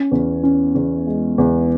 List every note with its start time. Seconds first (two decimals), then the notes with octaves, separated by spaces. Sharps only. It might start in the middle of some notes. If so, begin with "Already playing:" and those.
Already playing: C#4
0.11 E2
0.43 C#4
0.75 E2
1.07 G#3
1.38 E2